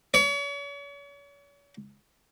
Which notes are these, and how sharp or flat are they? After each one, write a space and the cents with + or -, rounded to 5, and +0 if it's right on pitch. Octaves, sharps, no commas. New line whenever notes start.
C#5 +40